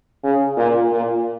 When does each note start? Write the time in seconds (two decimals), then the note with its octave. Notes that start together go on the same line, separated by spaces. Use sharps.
0.24 C#3
0.58 A#2
0.92 A#2